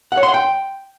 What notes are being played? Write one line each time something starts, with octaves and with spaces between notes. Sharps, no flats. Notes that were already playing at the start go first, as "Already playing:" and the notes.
F#5
C#5
C6
F#5
G5